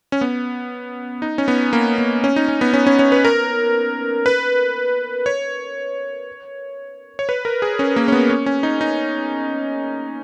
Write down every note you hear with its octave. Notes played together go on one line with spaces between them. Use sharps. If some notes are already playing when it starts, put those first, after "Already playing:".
C#4
B3
D#4
C#4
B3
A#3
B3
C#4
D#4
C#4
B3
C#4
C#4
C#4
B4
A#4
B4
C#5
C#5
B4
A#4
G#4
C#4
A#3
C#4
B3
C#4
C#4
D#4
D#4